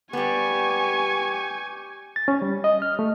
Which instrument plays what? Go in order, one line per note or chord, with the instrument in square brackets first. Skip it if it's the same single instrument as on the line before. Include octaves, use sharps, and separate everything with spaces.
[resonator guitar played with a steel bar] G3 B3 [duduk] G4 [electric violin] G#5 C#6
[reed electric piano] A6
C#4
G3
D#5
F6
A3